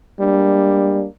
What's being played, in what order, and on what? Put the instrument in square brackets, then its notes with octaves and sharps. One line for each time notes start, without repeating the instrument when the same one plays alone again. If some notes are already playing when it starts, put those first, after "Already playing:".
[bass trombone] G3 [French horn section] G#3 A#3 D4